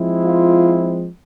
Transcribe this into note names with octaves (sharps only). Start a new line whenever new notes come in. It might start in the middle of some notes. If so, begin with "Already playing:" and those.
Already playing: F3 G#3 C4 E4
F4